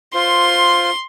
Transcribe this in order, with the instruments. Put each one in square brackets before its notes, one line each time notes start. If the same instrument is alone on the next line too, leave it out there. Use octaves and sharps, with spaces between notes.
[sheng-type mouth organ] F4 C5 [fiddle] C6